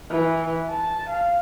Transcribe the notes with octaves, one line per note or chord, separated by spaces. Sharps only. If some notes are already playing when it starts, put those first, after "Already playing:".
E3
A5
F5